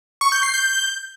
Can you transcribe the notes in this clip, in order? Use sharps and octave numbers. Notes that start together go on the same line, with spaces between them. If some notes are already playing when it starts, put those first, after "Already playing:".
C#6
G6
C7
G6